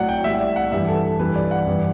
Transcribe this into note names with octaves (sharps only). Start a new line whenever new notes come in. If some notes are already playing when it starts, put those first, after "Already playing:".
Already playing: A2 F#3 D5 F#5
G5
A2 G3 E5
D5
F#5
G2 E3 G3 E5
A4
A4
G2 E3 G3 B4
D5
F#5
G2 E3 G3